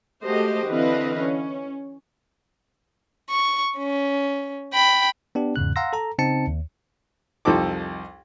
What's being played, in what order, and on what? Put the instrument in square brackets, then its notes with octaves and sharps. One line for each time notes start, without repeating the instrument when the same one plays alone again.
[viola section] G#3 A3 F#4 G4 C5 D#5
D3 E3 C4 B4 D#5 F5
C#4
[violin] C#6
C#4
G5 B5
[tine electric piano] B3 D4 G4
E2 G#2 C#3 F#6
F5 F#5 A#5 C6 E6 A#6
A4 A#5
C#3 C4 D#4 A5 C#7
D#2
[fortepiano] C2 F2 D#4 A4 D6